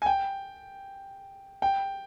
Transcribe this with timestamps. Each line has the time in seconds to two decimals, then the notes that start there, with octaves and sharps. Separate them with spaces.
0.02 G#5
0.06 G5
1.62 G5